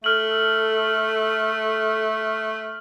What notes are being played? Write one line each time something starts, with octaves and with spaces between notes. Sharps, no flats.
A3 A4 F6 F#7